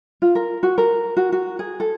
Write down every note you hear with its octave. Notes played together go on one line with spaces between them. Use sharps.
F4
A#4
F#4
A#4
F#4
F#4
G#4
A4